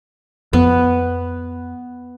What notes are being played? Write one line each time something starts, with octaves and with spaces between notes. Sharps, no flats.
F2 B3